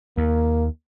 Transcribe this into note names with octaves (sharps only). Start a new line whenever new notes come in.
D#2 A#3